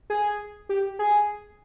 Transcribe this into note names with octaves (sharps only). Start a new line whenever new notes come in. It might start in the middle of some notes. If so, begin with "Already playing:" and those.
G#4
G4
G#4